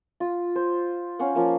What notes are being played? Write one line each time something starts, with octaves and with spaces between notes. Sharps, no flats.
F4
C5
C#4 F5 F#5
F3 A#3 C#4